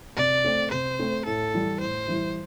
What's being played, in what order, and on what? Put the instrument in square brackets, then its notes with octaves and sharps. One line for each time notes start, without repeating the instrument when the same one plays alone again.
[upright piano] C3 [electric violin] D5
[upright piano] A3 C4
[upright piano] C3 [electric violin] C5
[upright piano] A3 C4
[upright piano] A2 [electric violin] A4
[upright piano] E3 G3 E4
[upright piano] A2 [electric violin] C5
[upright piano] E3 G3 E4